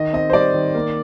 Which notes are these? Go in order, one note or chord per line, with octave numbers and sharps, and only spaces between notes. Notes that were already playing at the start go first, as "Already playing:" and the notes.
Already playing: D#3 D#5
C4 D#5
C5
G3 D5
D#3
A#3